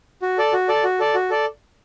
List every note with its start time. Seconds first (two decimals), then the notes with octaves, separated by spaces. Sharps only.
0.22 F#4
0.38 A4 D5
0.53 F#4
0.69 A4 D5
0.84 F#4
1.00 A4 D5
1.14 F#4
1.30 A4 D5